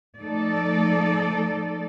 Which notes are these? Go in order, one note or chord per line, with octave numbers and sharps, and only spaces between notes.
F3 A3 D#4 A4 D5